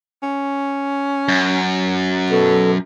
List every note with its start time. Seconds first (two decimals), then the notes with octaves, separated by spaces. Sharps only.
0.23 C#4
1.28 F#2
2.31 B2 A4